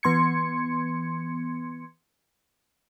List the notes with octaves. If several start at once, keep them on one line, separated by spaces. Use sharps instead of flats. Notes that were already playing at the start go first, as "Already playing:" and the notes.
E3 B3 C6 G#6 C#7